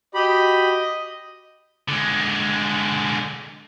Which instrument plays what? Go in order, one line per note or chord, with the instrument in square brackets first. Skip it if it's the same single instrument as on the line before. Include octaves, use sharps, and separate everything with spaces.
[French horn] F#4 [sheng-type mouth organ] G4 B5 [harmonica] D#5
[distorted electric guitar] D3 G#3